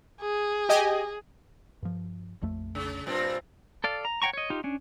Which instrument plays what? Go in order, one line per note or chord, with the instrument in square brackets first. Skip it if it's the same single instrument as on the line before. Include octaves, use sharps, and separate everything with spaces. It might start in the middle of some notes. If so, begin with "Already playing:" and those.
[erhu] G#4
[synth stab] G4 D#5 G#5
[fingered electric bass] G2 F3
A#1 F2 A3
[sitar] C#3
G2 A#2 C4
[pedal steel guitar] A4 D5 F5
A#5
C#5 F#5 G5 A#5 C#6
C#5 D#5
D#4 F4 G4
C#4 D4